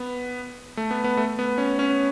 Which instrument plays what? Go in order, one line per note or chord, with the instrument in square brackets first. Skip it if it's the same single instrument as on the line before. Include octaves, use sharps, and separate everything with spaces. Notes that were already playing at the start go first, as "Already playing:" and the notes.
Already playing: [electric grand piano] B3
A3
B3
B3
A3
B3
C#4
C#4